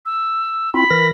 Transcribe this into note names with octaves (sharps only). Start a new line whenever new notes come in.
E6
C4 E4 F4 B5
E3 A#4 A#6